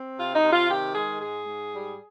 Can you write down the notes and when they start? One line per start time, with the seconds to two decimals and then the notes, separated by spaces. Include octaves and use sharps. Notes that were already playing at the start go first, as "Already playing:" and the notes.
Already playing: C4
0.18 C3 F4
0.35 D#4
0.43 C3
0.52 F4
0.69 D#3 G4
0.95 G#3 G#4
1.20 G#2 G#4
1.47 G#2
1.73 G3